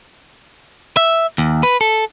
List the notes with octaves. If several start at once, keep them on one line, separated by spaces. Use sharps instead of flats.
E5
D#2
B4
A4